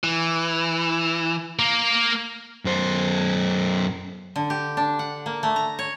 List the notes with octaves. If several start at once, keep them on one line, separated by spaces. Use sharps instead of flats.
E3
A#3 A#4
F#2 C5
D3
G4
D4
F#5
A#3
A3
A#5
C#5